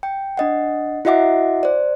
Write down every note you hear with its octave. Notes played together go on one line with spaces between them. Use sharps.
G5
D4 D#5 F#5
E4 F#4 D#5 E5 F#5 D6
C5 D5